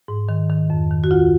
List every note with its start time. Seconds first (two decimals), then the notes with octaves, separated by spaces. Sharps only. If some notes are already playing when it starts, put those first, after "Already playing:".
0.08 G#2
0.29 D#3
0.50 D#3
0.70 F2
0.91 D#3
1.04 F#4
1.11 D2 F4